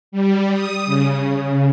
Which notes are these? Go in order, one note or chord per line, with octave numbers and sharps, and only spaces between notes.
G3
D#6
C#3